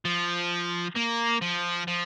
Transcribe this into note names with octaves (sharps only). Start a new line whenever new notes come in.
F3
A#3
F3
F3